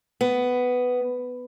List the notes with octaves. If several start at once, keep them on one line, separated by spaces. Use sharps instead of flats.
B3